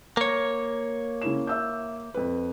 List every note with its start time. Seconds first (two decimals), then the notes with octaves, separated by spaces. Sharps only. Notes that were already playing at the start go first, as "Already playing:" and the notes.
0.17 A#3 C#5
1.22 C#3 E4 E7
1.47 E5 E6 G6
2.14 F2 B4